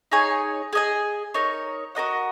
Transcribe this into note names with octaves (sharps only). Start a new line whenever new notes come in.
D#4 G#4 C#5 G#5
G#4 D#5 G#5
D#4 A#4 C#5
F#4 A#4 D#5 F#5